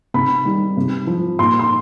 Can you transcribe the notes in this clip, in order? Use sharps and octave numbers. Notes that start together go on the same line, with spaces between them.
C3 B5
D#3 G3
C3
F3
A#2 C6
C6